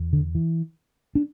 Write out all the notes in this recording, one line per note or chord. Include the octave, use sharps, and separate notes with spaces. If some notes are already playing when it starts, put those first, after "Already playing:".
Already playing: E2
D3
E3
D4